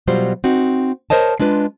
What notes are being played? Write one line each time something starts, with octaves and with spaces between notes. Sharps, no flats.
B2 F#3 G3 F4 C5
C4 D#4 F#4
A#4 C5 C#5 D#5 A5
G#3 D4 F4 B4